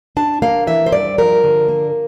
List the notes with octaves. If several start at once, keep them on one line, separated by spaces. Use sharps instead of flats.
D4 A5
A#3 F5
E3 E5
C5
G2 D5
F3 A#4
D3
A#3